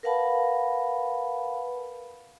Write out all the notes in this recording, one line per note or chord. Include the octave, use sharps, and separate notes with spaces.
A#4 B4 F5 F#5 A5 B5